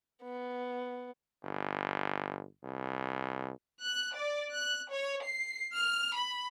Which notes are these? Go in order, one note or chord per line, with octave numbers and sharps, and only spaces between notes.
B3
G1
C2
F#6
D5
F#6
C#5
C7
F6
B5